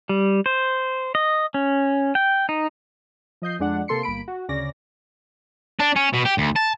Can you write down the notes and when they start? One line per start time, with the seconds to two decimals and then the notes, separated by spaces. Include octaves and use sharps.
0.09 G3
0.46 C5
1.15 D#5
1.54 C#4
2.15 G5
2.49 D#4
3.42 F3 D#5 G6 C7
3.59 F2 G#3 D4 F#5
3.88 C3 A#3 A4 C6 C7 C#7
4.03 G1 A#3 B5 D7
4.28 F#4
4.49 D2 C#3 C#4 D5 A#6
5.80 D4
5.96 C#4
6.13 B2
6.25 G4
6.38 D2
6.56 A5